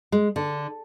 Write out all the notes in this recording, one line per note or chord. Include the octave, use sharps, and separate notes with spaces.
G#3
D3